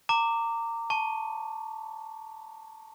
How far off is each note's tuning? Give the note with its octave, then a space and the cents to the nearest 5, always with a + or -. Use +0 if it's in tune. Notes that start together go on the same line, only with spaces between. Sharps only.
A#5 -25 D6 +0
A5 +0 C#6 +0